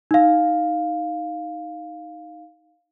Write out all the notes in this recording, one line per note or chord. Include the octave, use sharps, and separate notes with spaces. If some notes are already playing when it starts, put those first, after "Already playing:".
D#4 F5